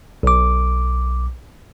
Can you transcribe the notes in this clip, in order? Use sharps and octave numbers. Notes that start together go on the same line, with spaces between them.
B1 D6